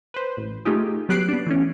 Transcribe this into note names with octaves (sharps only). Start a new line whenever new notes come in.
B4 C5
A1
A3 D#4 F4 G4 G#4
F#3 B3 G4 F#6 C7 D7
B3 D4
E3 A3 C#4